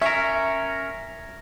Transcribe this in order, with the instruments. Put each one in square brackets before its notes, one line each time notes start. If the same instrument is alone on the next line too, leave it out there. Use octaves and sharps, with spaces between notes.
[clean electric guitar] C#4 A#4 [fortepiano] E5